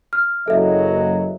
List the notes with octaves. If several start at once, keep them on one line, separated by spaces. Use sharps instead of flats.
F6
F#1 F#3 A4 D#5 E5